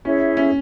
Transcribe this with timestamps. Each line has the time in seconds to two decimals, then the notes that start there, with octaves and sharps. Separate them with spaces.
0.05 C#4 E4 G#4 C#5 E5
0.37 C#4